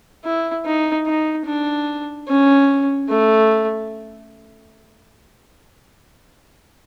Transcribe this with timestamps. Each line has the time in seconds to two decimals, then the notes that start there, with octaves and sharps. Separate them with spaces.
0.25 E4
0.66 D#4
1.07 D#4
1.46 D4
2.29 C#4
3.09 A3